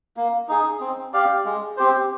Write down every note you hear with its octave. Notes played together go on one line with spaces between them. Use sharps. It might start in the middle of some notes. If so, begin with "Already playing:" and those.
A#3
D#4 G#4
C4
G4 D5 F5
G#3
C4 G4 C5